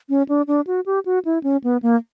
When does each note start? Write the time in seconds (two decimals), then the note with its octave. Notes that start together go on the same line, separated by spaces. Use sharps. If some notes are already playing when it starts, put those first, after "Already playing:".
0.09 C#4
0.29 D4
0.47 D4
0.67 F#4
0.86 G4
1.06 F#4
1.25 E4
1.44 C#4
1.64 B3
1.83 A#3